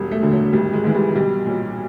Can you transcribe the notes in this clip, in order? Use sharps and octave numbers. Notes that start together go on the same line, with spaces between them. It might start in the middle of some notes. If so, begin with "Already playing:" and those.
Already playing: E1 G3
A3
D2 D3 F#3
F#3
G#1 G3
G#3
G#2 E3 G#3
G3
B1 G3
A#2 F#3